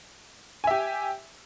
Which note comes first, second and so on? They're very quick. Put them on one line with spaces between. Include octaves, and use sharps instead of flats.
G#5 E5 G4